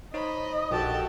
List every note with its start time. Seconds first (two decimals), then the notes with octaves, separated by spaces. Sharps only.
0.14 D#4 C5 C#5 D#5 B5
0.71 A#1 F#4 G4 A4 A5